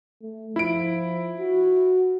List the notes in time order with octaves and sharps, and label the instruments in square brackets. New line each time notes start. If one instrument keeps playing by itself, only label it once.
[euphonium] A3
[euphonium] F3 [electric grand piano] E4 D7
[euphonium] F#4